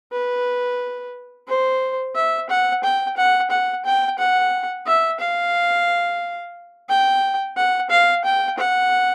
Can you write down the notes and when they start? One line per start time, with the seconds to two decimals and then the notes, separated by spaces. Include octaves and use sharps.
0.12 B4
1.48 C5
2.15 E5
2.49 F#5
2.84 G5
3.17 F#5
3.50 F#5
3.85 G5
4.18 F#5
4.87 E5
5.20 F5
6.89 G5
7.57 F#5
7.90 F5
8.25 G5
8.58 F#5